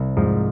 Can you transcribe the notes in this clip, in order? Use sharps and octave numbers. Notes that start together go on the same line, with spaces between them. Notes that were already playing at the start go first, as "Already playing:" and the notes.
Already playing: C2
G#2 F3